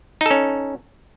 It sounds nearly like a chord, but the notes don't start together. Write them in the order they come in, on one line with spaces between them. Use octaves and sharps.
D#4 A4 C#4